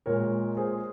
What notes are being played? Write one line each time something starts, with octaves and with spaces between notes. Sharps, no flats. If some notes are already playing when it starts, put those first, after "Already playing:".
A#2 G#3 A#4 C#5
G#4 C5